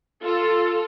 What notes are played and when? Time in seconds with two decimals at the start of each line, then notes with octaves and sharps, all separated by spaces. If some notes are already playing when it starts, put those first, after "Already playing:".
0.22 F4 A4